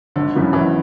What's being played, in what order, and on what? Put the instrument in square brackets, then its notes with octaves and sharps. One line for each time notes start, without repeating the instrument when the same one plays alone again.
[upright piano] G#1 [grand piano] D3
[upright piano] F#2 C#3 E3 B3
[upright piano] G#1 [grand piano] E3